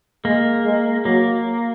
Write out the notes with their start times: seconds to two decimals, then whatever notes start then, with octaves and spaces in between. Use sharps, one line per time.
0.25 G#3 A#3
0.65 G#3
1.05 F#3 A#3